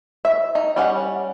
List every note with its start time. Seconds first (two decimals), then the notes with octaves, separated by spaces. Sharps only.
0.25 E5
0.55 D#4
0.76 G3 C#4 F#5